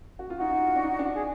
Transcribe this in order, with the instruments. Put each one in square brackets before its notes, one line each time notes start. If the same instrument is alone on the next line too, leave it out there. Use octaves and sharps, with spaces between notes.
[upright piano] F#4
F4
[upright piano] D#4 [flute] F#4
[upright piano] D#4
F4
D4
D#4
D4
[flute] G#4